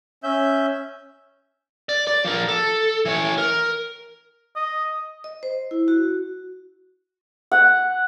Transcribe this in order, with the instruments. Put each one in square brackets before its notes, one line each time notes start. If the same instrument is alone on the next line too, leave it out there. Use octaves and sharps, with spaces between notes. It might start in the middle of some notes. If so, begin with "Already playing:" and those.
[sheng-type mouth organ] C#4 E5 G6
[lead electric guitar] D5
D5
F3 A#4
A4
E3 C#5
A#4
[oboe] D#5
[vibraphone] D#5
C5
E4
F#4
[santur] F#5